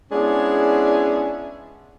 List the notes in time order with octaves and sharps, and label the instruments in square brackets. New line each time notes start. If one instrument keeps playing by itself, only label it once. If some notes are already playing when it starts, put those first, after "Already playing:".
[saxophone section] G#3 B3 C#4 D4 E4 G#4